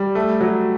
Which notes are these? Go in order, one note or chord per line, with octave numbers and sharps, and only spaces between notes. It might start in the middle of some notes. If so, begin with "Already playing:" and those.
Already playing: G3
A3
F#3